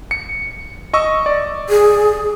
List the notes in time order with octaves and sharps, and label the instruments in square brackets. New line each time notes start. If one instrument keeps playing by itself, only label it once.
[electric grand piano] C#7
D#5 C#6 E6
D5
[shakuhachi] G#4